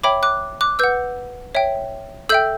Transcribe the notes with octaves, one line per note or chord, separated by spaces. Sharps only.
C#5 E5 G5 B5 D6
D6 F#6
D6 F#6
B4 F#5 E6 G6
C#5 E5 G5
A4 E5 G5 E6 G6